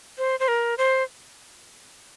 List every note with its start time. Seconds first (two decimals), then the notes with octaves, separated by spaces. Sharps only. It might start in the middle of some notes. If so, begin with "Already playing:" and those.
0.18 C5
0.40 C5
0.48 A#4
0.78 C5